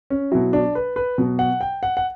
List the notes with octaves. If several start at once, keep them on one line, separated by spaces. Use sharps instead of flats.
C#4
B2 F#3 E4
D4
B4
B4
B2 F#3
F#5
G5
F#5
F#5